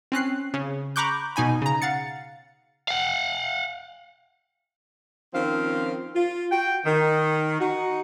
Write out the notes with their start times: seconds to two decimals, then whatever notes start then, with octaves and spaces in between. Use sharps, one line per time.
0.12 C4 C#4 F#6 C7
0.54 C#3
0.96 A#5 B5 C#6 D6 F#6 G6
1.36 B2 D#4 G#5 B5
1.62 C#3 A#5
1.82 F5 F#5 A6 C#7
2.88 F5 F#5
5.33 D#3 F3 C4 C#4 F5
6.15 F4
6.51 F#4 G5
6.85 D#3
7.60 D#4 F#4